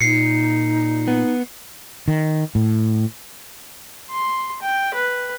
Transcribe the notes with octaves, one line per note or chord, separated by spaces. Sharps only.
A#2 D#4 C7 C#7
B3
D#3
A2
C6
G5
B4